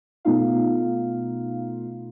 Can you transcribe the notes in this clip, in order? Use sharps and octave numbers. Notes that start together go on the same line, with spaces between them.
B2 A3 B3 D#4 F4 F5